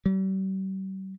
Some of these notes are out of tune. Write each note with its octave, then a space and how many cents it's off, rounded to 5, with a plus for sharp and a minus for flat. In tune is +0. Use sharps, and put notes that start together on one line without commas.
G3 -40